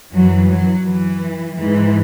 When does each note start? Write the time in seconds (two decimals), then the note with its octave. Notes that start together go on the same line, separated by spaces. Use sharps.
0.13 F#2 E3 F#3
0.49 F#3
0.84 E3
1.56 G#2 E3